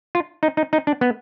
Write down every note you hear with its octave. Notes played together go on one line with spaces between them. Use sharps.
F4
D#4
D#4
D#4
D4
B3